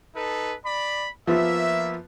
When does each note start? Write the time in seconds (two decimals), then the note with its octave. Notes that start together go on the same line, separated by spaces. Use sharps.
0.14 D#4 A4 B4
0.65 D5 B5
1.27 F3 A#3 B3 F4 E5